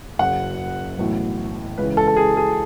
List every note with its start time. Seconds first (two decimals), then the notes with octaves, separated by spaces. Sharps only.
0.19 F#1 F#2 C#3 F#5
0.99 B1 A2 E3
1.78 C#2 C#3 E3 B4
1.97 A4
2.08 A4
2.16 G#4
2.37 G#4